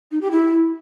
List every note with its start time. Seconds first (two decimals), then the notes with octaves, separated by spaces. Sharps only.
0.11 D#4
0.21 G4
0.31 E4